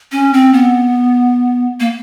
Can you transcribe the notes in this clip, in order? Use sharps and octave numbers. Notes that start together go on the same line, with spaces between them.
C#4
C4
B3
A#3